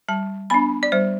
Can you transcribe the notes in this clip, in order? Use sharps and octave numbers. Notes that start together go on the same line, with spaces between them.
G3 A5
B3 D4 B5
D5
G3 C5